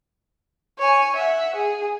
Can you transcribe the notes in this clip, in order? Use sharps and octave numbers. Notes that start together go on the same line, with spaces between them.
C#5 G#5
E5 F#5
G#4